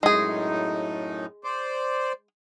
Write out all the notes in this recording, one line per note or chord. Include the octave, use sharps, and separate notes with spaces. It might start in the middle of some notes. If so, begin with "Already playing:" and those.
F#2 A2 G#3 D#4 G#4
C5 D5